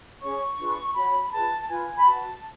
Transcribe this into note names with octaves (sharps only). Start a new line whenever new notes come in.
C#4 G#4 C#5 C#6
D4 F4 G#4 B4
F#4 C#5 B5
B5
F4 G#4 B4 A5
F4 B4 G#5
B5
F#4 B4 A5